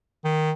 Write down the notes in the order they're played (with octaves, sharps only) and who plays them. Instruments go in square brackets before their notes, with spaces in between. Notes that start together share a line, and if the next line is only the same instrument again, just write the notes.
[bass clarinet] D#3